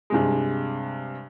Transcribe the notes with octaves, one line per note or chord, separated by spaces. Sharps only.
G2 C3 G#3